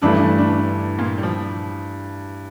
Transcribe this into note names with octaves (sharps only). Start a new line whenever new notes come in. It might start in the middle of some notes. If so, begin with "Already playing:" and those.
G2 D3 E3 A3 D4
D3 D4
A#2 A#3
G3
F3